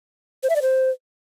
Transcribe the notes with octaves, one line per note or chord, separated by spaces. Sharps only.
C5
E5
D5
C5